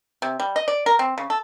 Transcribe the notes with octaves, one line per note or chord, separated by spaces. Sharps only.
C3
G3
D#5
D5
A#4
C4
C#3
A4